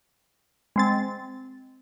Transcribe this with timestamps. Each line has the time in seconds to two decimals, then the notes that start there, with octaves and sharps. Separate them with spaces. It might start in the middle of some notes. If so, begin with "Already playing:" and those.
0.76 G#3 C4 A6